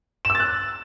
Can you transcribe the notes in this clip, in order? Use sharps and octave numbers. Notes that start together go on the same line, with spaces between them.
E7
E6
A6
F#6